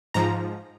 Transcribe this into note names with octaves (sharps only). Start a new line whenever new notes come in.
G#2 F3 A#5